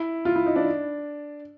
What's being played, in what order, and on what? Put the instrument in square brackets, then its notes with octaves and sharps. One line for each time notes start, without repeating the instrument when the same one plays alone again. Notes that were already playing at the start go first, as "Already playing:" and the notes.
Already playing: [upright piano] E4
F4
E4
D#4
D4